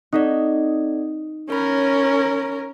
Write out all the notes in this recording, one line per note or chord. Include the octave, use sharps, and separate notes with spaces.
C4 D#4 A4 D5
C#4 A#4 C#5 B5